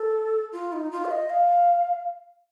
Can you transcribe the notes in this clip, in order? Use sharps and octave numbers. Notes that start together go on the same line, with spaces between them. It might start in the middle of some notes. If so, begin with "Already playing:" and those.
Already playing: A4
F4
D#4
F4
F5
D#5
F5